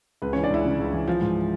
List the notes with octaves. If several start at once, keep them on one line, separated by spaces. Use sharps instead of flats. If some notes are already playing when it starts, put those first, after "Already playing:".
C#2 B4
E3 C#4 C#5
D4 D5
C#2 E4 E5
C#3
C#2
E3
F3
G#2